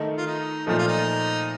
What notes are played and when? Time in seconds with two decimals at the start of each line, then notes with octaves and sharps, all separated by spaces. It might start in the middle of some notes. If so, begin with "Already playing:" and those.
Already playing: D#3 A3 D#4
0.17 F4
0.27 D#4
0.67 A#2 F3 A3 D#4
0.78 F4
0.88 D#4